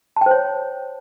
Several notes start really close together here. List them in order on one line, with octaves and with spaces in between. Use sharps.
A5 G5 C5 C#5